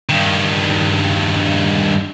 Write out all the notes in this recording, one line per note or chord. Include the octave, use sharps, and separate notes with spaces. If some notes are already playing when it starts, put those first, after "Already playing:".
G2 D#3